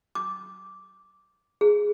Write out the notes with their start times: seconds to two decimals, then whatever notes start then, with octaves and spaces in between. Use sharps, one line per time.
0.15 D6
1.61 G#4